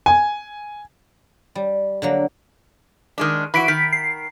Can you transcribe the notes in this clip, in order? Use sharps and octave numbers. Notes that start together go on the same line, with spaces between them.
G#5
G3
D3 F#3 A#3
D#3 G#3 D4
E3 F#4 B5 B6 D7
D#3 B6
C7